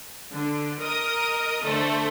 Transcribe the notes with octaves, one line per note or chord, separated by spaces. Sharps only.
D3
A#4 D#5 D#6
D3 A3 A4 C5